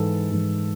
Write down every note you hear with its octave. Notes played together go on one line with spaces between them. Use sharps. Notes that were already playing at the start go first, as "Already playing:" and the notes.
Already playing: G#2 E3 A4
G#2 E3